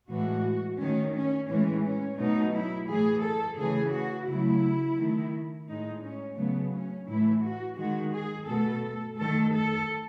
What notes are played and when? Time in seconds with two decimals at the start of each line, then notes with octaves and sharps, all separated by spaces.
0.10 A2 E3 G#3 F#4
0.80 D#3 A3 C#4
1.15 C#4
1.50 A2 E3 G#3 C#4
1.84 C#4
2.19 B2 F#3 A3 D#4
2.54 E4
2.89 A2 E3 A3 G#4
3.24 A4
3.59 C#3 E3 A3 G#4
3.94 F#4
4.28 C#3 F#3 A3 E4
4.99 D#3 A3
5.69 A2 G#3 D#4
6.03 C#4
6.38 C#3 F#3 A3 B3
6.74 C#4
7.08 A2 E3 A3 E4
7.43 F#4
7.78 D#3 G#3 F#4
8.13 G#4
8.48 B2 A3 A4
9.18 D#3 A3 A4
9.53 A4